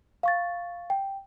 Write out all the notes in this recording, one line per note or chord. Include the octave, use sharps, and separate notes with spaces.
F5 C#6 A6
G5